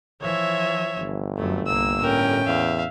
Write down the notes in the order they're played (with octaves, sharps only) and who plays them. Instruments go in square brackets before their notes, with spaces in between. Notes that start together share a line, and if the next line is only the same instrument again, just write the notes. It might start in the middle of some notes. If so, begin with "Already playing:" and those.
[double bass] E3 F3 [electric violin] C#5 E5
[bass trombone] G1
[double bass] F#2 [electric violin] A3
[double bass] C2 A#3 [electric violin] E6
[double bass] A2 [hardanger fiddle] C#4 G5 [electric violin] A#4
[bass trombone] E2 [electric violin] E5 F5